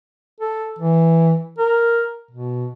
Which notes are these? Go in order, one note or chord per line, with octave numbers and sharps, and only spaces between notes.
A4
E3
A#4
B2